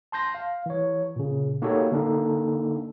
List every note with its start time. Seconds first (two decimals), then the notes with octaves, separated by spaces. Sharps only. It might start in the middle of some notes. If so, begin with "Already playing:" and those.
0.12 A5 C6 G6 A#6
0.35 F5
0.66 E3 C#5
1.16 A#2 C#3
1.62 A#3 D#4 F#4 G4 A4 C#5
1.91 D3 A#3 D4 D#4 A4